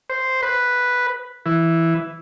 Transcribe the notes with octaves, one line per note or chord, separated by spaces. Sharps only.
C5
B4
E3